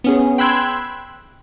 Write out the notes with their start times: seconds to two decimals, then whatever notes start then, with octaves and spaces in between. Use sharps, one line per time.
0.04 B3 C#4 G#4
0.38 G5 B5 C6 E6 F#6 G#6